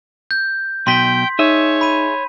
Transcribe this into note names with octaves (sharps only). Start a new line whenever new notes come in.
G6
B1 B2 G5 C6 B6
D#4 G#4 C#5 E5
B5 D#7